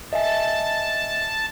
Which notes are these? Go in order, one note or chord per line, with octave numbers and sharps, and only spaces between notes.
D#5 E5 G#5 A5